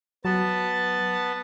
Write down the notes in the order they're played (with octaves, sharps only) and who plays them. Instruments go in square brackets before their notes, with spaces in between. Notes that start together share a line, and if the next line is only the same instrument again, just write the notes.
[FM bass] F#3 [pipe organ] B3 A5